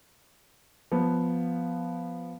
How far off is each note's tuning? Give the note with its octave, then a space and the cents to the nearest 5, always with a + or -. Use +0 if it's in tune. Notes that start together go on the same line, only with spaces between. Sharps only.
F3 +0 B3 +0